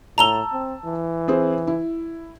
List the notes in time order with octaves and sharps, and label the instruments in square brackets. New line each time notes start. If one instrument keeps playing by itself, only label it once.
[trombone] A2 [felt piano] A5 E6 [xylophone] A#5 F7 G7
[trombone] C4
E3
[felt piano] C4 G#4 C5
E4